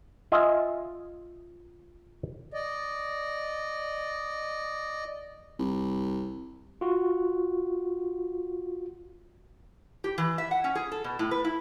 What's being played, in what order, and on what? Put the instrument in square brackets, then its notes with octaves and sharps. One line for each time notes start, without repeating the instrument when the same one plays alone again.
[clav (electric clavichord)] F4 D#5 E5 G#5
[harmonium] D5 D#5
[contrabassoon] C2
[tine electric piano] F4 F#4
[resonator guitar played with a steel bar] G4
E3
E5
F#5
C#4
G#4
A4
B2
A2
B4
E4